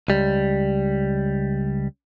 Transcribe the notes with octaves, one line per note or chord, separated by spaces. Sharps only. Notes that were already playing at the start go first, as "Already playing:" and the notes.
C#2 G3